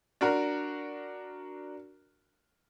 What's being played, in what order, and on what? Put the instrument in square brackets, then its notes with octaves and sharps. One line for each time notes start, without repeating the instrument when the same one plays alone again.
[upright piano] D4 F#4 A#4